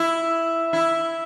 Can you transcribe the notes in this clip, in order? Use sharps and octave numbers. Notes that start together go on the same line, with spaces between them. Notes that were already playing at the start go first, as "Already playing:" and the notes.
Already playing: E4
E4